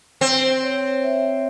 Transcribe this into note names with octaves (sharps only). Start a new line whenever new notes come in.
C4 C5
C#5
E5